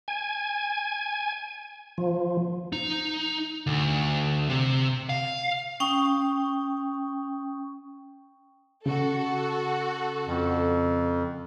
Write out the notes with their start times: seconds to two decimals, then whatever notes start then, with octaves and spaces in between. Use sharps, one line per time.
0.08 G#5
1.98 F3
2.73 D#4
3.67 D2
4.50 C3
5.09 F5
5.80 C#4 G5 C#6 D#6
8.86 C#3 F#4 A4
10.27 F2